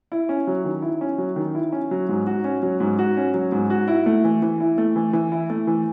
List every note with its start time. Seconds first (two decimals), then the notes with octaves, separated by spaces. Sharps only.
0.12 E4
0.29 C#4
0.47 F#3
0.65 D#3
0.82 E4
1.01 C#4
1.18 F#3
1.36 D#3
1.55 E4
1.72 C#4
1.91 F#3
2.09 G#2
2.27 F#4
2.44 C#4
2.63 F#3
2.80 G#2
2.99 F#4
3.17 C#4
3.34 F#3
3.52 G#2
3.70 F#4
3.88 E4
4.06 A3
4.24 E3
4.42 E3
4.60 E4
4.78 A3
4.96 E3
5.13 E3
5.32 E4
5.50 A3
5.67 E3